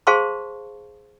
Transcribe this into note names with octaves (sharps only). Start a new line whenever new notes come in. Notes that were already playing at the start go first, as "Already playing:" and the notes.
G#4 C5 F5 A5 C6 C#6